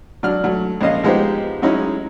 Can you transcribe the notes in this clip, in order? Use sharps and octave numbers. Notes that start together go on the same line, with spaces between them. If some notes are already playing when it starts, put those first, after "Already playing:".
F#3 D4 F6
F#3 A3
A#1 C#4 D#5 F5
F3 G#3 B3 D#4 G4 C5
F#3 G#3 C#4 D#4 E4